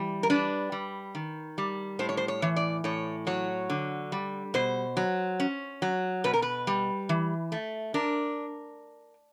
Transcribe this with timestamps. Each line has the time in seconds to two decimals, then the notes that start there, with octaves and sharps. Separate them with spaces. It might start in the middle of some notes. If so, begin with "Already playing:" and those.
Already playing: E3 G3
0.23 A#4
0.30 D4 B4
0.72 G3
1.15 D#3
1.58 G3
1.99 A2 C5
2.09 C#5
2.17 C5
2.28 C#5
2.42 E3
2.56 D5
2.84 A2 C#5
3.27 F#3 C#5
3.70 D3
4.12 G3
4.54 B2 C5
4.97 F#3
5.40 C#4
5.82 F#3
6.24 B2 B4
6.34 A#4
6.42 B4
6.67 G3
7.09 E3
7.52 A3
7.94 D4 A#4